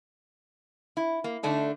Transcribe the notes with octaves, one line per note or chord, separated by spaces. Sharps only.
E4
A#3
D3 A3 D4 D#4